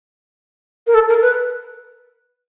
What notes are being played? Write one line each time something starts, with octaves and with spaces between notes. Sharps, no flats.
A#4
A4
A#4
B4